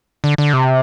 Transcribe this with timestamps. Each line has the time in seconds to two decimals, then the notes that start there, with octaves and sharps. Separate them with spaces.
0.24 D3
0.38 D3
0.53 C3